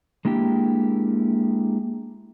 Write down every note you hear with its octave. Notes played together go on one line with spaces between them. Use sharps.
G#3 A#3 D4 E4 G4